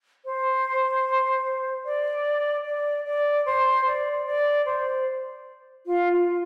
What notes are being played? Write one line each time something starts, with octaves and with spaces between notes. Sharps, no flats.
C5
D5
D5
D5
C5
D5
D5
C5
F4
F4